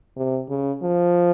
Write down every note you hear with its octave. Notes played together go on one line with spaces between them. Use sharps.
C3
C#3
F3